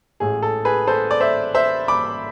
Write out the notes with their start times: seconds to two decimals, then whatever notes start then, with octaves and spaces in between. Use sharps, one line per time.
0.20 A1 A2 G#3 G#4
0.43 A4
0.65 G#4 B4
0.87 A4 C5
1.11 D5
1.20 C5 E5
1.55 C5 E5
1.88 B5 D6